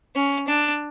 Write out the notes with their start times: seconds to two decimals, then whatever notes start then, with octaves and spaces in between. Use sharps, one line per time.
0.15 C#4
0.48 D4